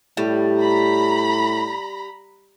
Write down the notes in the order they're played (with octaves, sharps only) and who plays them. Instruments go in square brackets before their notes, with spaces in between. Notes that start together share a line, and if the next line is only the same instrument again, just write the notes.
[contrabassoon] A2 [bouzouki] G3
[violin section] A#5 B5